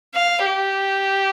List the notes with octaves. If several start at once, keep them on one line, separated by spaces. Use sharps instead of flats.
F5
G4